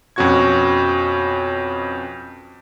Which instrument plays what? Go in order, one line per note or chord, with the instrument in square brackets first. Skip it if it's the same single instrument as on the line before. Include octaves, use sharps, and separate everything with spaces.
[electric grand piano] F2 B2 C#4 F#4 C#6 G#6